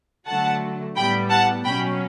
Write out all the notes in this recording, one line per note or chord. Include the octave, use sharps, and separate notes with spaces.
D3 F#3 A3 F#5 A5
A2 G3 B3 G5 B5
F#5 A5
B2 F#3 C#4 G5 B5